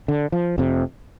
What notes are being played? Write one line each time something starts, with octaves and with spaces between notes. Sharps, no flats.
D3
F3
F1 F2 C3